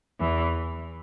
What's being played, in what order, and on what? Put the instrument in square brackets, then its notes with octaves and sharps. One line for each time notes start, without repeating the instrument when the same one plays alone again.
[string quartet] E2 E3